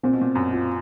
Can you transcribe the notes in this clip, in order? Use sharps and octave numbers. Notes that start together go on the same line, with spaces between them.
A#2 C4
B2
A#2
F#2
F4